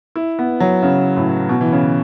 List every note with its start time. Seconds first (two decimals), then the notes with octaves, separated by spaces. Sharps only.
0.16 E4
0.39 B3
0.60 F#3
0.83 C#3
1.16 A2
1.49 B2
1.61 E3
1.72 C#3